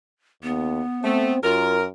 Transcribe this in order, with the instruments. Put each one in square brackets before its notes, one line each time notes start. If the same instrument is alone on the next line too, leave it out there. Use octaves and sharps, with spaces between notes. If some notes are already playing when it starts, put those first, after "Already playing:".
[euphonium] D#2 [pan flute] B3
[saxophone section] A3 [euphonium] C4
[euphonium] F#2 [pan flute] F4 [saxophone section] A#4